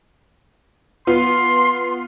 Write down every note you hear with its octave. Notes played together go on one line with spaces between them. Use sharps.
B3 F4 C6